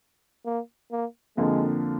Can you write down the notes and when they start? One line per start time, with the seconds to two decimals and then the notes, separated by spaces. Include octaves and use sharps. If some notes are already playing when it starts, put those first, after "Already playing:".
0.45 A#3
0.91 A#3
1.37 F2 D3 F3 G#3 A#3